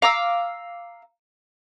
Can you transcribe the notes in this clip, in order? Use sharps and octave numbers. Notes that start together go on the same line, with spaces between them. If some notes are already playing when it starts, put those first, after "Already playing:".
F5 A#5 D6 E6